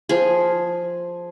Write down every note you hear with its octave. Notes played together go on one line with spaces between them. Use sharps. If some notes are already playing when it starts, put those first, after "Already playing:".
F3 G#4